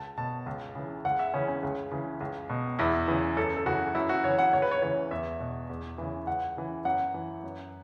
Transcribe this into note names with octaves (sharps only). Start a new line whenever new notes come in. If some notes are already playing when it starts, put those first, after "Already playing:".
Already playing: C#2 A5
B2 A5
C#2
C#3 E3
C#2 F#5
E5
C#3 E3 C#4
C#4
C#2
C#3 E3
C#2
B2
E2 E4
C#3 E3
F#2 A4
A4
C#3 E3 F#4
F#2 E4
F#4
C#3 E3 C#5
F#5
C#2 C#5
B4
C#5
C#3 E3 C#5
E2 E5
B2
E2
C#3 E3
C#2 F#5
C#3 E3
F#2 F#5
E3
F#2